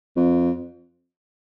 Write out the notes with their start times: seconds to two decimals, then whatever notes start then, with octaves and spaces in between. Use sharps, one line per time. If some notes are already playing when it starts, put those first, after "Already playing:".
0.16 F2